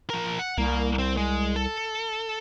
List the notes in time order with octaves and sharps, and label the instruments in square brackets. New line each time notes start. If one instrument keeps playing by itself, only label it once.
[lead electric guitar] F3 A#4
F#5
[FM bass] C2 [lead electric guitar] A#3
[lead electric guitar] C4
G#3
A4